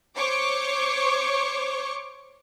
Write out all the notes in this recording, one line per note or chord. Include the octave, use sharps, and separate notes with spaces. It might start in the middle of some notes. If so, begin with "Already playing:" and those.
C5 C#5 C#6 D6